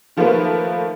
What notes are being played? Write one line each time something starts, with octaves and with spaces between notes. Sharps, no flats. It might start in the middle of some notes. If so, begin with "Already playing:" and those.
D#3 F3 A3 A#3 F4 B4